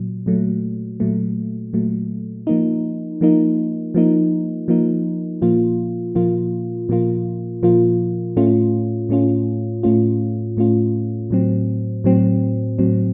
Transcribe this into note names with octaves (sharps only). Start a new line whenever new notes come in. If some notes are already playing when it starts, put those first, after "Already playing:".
Already playing: A#2 F#3
A#2 F#3 A3
A#2 F#3 A3
A#2 F#3 A3
F3 A#3 D#4
F3 A#3 D#4
F3 A#3 D#4
F3 A#3 D#4
A#2 F3 A#3 F4
A#2 F3 A#3 F4
A#2 F3 A#3 F4
A#2 F3 A#3 F4
A2 A3 C#4 F4
A2 A3 C#4 F4
A2 A3 C#4 F4
A2 A3 C#4 F4
A2 F#3 C4
A2 F#3 C4
A2 F#3 C4